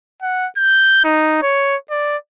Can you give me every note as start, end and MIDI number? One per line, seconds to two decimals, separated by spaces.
0.22 0.48 78
0.57 1.00 91
1.04 1.38 63
1.42 1.76 73
1.90 2.17 74